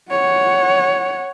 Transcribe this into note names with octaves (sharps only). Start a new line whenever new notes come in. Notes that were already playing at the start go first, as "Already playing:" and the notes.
C#5 F#5